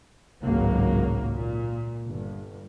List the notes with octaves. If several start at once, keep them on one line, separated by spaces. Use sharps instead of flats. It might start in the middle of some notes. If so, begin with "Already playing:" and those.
G#1 C#2 A2 F#3 A#3
A#2
G1